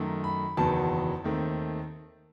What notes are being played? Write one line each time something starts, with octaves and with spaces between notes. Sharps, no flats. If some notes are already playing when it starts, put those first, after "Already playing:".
Already playing: F#2 D#3 A3
B5
F#1 E2 D#3 F#3 B3 A5
D#2 D#3 A3 C4